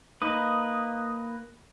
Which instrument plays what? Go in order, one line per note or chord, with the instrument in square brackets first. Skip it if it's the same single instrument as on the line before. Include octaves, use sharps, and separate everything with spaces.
[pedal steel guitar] A#3 B4 [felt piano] D#4 [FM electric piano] D#6